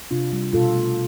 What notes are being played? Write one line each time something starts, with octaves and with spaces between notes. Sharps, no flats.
C3 D4 F4
G3
B2 F4 A4
A3